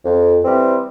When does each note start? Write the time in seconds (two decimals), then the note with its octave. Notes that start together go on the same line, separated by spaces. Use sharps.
0.05 F2
0.45 E3 G3 C4